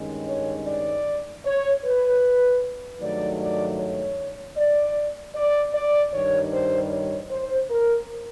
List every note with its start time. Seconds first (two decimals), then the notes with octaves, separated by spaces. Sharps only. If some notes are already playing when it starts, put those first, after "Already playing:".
Already playing: G2 D#3 G#3 C#4
0.28 C#5
0.67 D5
1.45 C#5
1.84 B4
3.01 G2 D#3 F#3 A3 D5
3.40 D5
3.78 C#5
4.57 D5
5.35 D5
5.74 D5
6.13 G2 D#3 G3 C#5
6.52 C5
6.91 C#5
7.30 C5
7.70 A#4